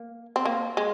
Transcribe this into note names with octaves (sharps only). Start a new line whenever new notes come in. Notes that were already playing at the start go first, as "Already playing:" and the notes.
Already playing: A#3
C4
A#3
G#3